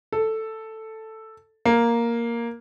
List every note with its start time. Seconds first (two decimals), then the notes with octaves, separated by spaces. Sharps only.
0.12 A4
1.65 A#3